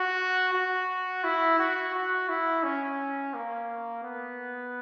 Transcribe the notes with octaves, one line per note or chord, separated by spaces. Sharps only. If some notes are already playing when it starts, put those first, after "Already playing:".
Already playing: F#4
F#4
E4
F#4
F#4
E4
C#4
A#3
B3